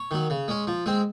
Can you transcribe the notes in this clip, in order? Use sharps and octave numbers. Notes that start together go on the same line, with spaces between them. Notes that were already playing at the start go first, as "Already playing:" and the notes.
Already playing: C#5
D#3 F#3
C#3
G#3 C#4
F3
G#3 C4